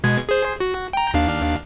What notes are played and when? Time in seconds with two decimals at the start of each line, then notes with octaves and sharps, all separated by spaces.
0.04 B2 G#3 G#6
0.29 G#4 C5
0.60 F#4
0.93 G5 A#5
1.14 D#2 D4 F5